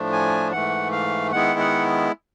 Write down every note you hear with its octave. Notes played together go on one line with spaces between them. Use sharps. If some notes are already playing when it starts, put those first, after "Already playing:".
Already playing: A2 F3 A3 D4
G#5
G#2 E3 A3 F#5
F5
D#3 G#3 B3 E4 F#5
F#5